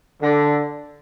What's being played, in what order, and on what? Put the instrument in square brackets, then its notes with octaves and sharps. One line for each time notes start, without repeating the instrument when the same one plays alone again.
[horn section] D3